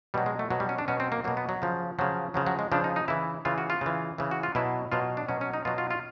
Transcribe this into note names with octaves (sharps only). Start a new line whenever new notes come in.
B2 F#3 G3
G#3
A3
B2 F#3
G3
C#4
D4
B2 F#3 C#4
C4
A#3
B2 F#3 A#3
B3
F#3
C#3 F3
C#3 F3 F#3
C#3 F3 F#3
F#3
G#3
C#3 F3 D4
D#4
D#4
C#3 E3 E4
C#3 E3 F4
F#4
F4
C#3 E3
C#3 E3
F#4
F4
B2 F#3 E4
B2 F#3 F4
D4
B2 F#3 C#4
C#4
D#4
B2 F#3 F4
F4
F4